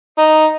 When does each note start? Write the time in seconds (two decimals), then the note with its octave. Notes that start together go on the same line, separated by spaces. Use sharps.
0.18 D#4